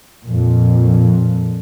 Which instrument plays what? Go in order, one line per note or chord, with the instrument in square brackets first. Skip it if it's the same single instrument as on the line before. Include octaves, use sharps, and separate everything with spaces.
[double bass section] F2 A#2